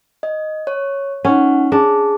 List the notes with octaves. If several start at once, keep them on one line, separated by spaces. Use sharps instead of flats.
D#5
C#5
C#4 D#4 F#5
D4 G#4